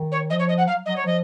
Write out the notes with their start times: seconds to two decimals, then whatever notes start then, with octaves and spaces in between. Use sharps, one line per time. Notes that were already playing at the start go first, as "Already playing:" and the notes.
Already playing: D#3
0.12 C#5
0.30 F3 D#5
0.39 C#5
0.49 D#5
0.58 F#5
0.67 F#3 F5
0.86 F#3 D#5
0.96 C#5
1.04 F3 D#5